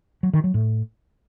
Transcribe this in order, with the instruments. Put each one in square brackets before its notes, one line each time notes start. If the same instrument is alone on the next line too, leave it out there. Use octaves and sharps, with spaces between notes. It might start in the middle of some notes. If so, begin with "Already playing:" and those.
[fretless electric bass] F#3
D#3
F#3
A2